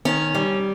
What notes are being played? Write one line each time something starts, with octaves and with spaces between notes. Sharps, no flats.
D#3 C#4
G3